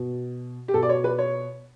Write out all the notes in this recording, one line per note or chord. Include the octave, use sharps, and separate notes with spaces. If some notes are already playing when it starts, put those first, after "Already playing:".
Already playing: B2
G4
B2 A4
D5
C#5
B4
C#5